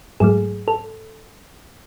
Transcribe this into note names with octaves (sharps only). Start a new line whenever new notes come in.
G#2 F#3 A3 G#4
A4